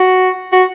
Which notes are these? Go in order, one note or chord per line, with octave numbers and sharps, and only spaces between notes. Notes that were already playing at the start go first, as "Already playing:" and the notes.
Already playing: F#4
F#4